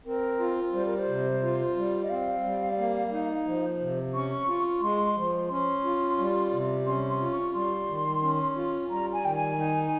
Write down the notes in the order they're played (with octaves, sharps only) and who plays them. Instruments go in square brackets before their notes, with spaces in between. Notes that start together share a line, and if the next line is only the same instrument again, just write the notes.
[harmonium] C4 [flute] A#4
[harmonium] F4
[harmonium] G3 [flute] C5
[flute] A#4
C5
[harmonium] C3
F4
G3
[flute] D#5
[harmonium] C4 [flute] F5
[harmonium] G3
A#3
D#4
F3
C3
[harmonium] C#4 [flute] C#6
[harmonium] F4
[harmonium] G#3 [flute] C6
[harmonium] F3
[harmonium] C#4 [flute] C6
[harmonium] F4
G3
C3
[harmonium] C#4 [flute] C6
[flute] C6
[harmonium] F4
[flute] C#6
[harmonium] G3 [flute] C6
[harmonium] D#3
C#4
F4
[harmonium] G3 [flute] A#5
[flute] G#5
[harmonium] D#3 [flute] G5
[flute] G#5
[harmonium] D#4